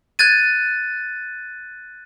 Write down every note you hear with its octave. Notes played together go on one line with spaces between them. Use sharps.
F#6 G#6 A6 D#7